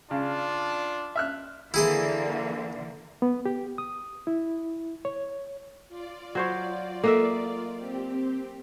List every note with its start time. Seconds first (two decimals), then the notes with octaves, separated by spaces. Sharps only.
0.11 C#3 D4 F4
1.16 E5 F6 F#6
1.74 D3 E3 A#3 E4 G#4 C6
3.22 B3
3.46 G4
3.78 D#6
4.27 E4
5.05 C#5
5.89 F4 D5
6.35 F#3 C5 C#5
7.04 A#3 A4 D#5 E5
7.78 C4 G4